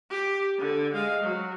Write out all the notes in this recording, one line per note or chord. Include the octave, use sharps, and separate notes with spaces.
G4
D3
G#3 F5
F#3